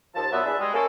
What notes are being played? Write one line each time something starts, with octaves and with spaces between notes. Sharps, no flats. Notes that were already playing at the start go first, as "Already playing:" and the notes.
D#2 F3 A5
A#2 F#3 B3 E5
E2 E3 D4 G#4 B4 E5
G3 G#3
A#3 C#4 A4